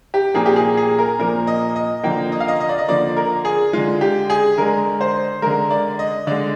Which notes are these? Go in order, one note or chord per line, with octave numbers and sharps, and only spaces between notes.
G4
A#2 F3 A#3 G#4
G4
G#4
G#4
A#4
A#2 F3 A#3 A#4
D#5
D#5
D3 F3 A#3 G5
D#5
F5
D#5
D#5
D5
D#5
D3 F3 A#3 D5
A#4
G#4
D3 G#3 F4
G4
G#4
D3 G#3 A#4
C5
D3 G#3 A#4
D5
D#5
D3 G#3 D5